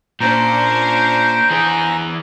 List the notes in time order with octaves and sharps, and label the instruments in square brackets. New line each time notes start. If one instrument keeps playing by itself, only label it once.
[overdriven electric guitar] A#2 [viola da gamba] C#4 D4 C5 [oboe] G5 [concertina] A#5
[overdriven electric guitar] E3 G#4